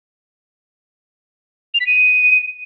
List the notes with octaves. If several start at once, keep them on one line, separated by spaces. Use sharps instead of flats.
F7
B6
D#7